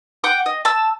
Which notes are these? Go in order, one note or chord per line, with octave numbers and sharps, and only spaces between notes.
F#5 G5 D6
D#5
A5 E6